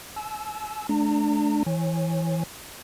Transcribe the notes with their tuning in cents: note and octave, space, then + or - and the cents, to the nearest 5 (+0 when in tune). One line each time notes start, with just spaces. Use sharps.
G#5 +45 E6 +0
A3 -35 D4 +0 A#5 -45
E3 +0 C#5 -30 G#5 -10